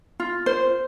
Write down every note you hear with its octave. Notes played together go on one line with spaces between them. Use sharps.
F4
C5